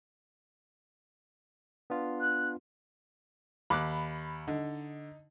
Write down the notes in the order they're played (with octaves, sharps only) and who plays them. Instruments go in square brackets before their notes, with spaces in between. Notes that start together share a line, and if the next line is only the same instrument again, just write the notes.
[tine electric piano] B3 D4 F4
[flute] F#6
[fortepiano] D#2 D6 F#6 [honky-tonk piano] B5
[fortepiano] D3 [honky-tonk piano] D#4